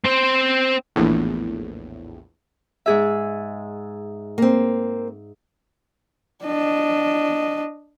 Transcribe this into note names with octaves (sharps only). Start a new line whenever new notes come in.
C4 C5
A#1 E2 A2
G#2 G#4 E5
A#3 C4
D4 D#5